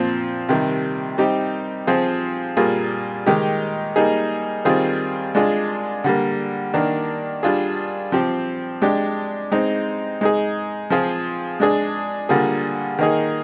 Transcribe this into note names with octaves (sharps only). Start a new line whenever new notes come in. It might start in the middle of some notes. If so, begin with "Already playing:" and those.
Already playing: A#2 F3 C4 F4
C3 D#3 G3
G3 C4 D#4 G4
F3 C4 F4 G#4
A#2 G3 A#3 F4 G#4
D#3 G#3 D#4 G4
G3 A#3 D#4 G#4
D#3 G3 C4 F4 G#4
G#3 D4 F4 G#4
D3 G3 A#3
D#3 A#3 D4
G3 D4 F4 G#4
F3 C4 G4
G#3 D4 G4
G#3 C4 D#4
G#3 D#4 G#4
F3 C4 F4 G#4
G#3 D4 G#4
D3 G3 A#3 F4 G#4
D#3 A#3 D#4 G#4